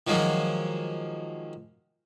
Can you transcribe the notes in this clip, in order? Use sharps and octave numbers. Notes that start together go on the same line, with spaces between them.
D#3 F3 F#3 G#3 A#3